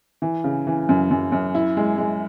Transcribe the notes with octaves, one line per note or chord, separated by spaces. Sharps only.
E3
C#3
E3
F#2
F#2
F#2
E4
G#3
G#3